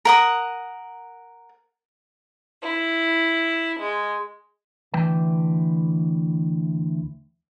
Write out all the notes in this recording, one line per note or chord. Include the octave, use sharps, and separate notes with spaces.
A#4 F#5 D#6
E4
G#3
D2 E3 B4 G5 A5